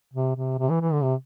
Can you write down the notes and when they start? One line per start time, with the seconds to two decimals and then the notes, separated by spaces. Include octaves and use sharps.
0.14 C3
0.36 C3
0.59 C3
0.70 E3
0.81 E3
0.93 D3
1.03 C3